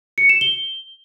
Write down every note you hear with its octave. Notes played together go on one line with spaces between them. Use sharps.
C#7
E7
G7